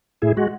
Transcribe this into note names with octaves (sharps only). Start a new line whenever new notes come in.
A2 E4 G#4
G#3 F#4